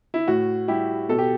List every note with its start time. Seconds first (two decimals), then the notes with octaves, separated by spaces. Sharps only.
0.14 E4
0.28 A2 F#4
0.68 G3 E4 G4
1.09 B2 A4
1.19 G4